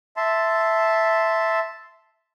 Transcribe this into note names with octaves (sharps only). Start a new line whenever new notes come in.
E5 A5 C6